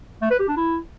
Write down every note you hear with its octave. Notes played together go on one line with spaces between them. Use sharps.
A3
B4
G4
D4
E4